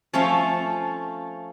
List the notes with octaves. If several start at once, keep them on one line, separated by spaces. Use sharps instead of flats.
F3 A3 C#4 F4 E5 F5